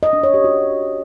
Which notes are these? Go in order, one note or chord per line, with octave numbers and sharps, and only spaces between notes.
D#5
D4
C#5
G4
F#4